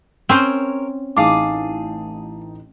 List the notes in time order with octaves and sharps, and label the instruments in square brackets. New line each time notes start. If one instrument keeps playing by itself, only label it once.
[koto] C4 C#4 C5 [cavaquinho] A#4 C#5
[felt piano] A1 D#4 A5 [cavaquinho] G#4 F5 D6